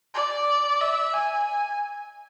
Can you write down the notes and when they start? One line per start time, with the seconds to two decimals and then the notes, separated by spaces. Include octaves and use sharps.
0.15 D5
0.81 E5
1.14 G#5